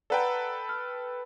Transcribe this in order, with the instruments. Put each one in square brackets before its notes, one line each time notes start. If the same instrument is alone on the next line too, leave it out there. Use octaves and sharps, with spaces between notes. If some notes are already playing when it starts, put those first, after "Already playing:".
[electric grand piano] A4 B4 G5 [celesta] D5 F#5 A#5
[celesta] F6